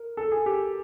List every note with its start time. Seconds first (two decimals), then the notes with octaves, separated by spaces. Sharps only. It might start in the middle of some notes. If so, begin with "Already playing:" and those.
Already playing: A#4
0.17 A4
0.32 G#4
0.46 G4